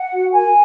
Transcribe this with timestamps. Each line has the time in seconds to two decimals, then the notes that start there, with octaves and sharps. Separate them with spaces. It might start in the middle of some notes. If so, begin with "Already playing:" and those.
Already playing: F#5
0.13 F#4
0.33 A#4 G#5